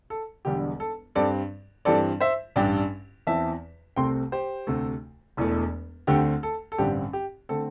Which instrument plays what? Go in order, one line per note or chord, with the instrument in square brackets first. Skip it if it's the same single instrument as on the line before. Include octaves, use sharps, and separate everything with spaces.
[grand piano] A4
E1 E2 D3 G3 G4
A4
G2 G3 C4 A4 D5
G2 E3 G3 C4 A4 D5
C5 E5
A1 G2 G3 D4 D5 G5
E2 E3 C4 E5 A5
C2 C3 A3 C4 G5 C6
G4 C5
D2 C3 A3
E1 E2 E3 A3
D2 D3 A3 C4 G4
A4
A4
A1 G2 D3 G3 C4 G4
G4
D3 A3 C4 A4